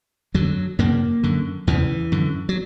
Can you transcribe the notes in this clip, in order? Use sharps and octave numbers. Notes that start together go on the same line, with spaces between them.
F#2 D3 F#3
F#2 C#3 A#3
F#2 D3
E2 C#3 E3
F#2 D3
F#3